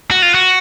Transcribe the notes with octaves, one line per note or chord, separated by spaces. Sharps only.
F#4
F4
F#4